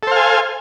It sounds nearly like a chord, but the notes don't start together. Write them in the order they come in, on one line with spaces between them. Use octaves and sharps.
A4 C5 F5 G#5